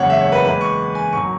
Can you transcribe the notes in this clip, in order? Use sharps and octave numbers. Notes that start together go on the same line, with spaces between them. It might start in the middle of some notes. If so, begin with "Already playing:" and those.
Already playing: F#1 E2 C#3 G#3 C#5 F#5
E5
C#5
B4
E2 E3 G#3 B4
C#6
G#5
G#1 F#3 C#6